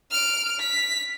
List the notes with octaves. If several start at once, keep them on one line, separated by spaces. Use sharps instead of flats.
F6 D7
B6